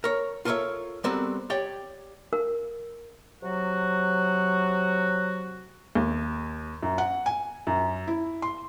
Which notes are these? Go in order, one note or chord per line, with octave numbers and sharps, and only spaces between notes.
A#4 C#5
F4 A4 A#4 C5 C#5 E5
G3 B3 C4 F#4 A4 A#4
G4 C#5 D5 G5
A#4
C3 F#3 F#4
D#2
F#2
F#5
G#5
F#2
E4
C6